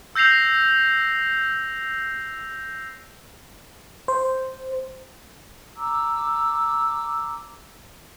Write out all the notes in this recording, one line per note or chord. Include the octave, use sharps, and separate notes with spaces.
E6 G6 A#6 C7 F7
C5
A#5 D6 E6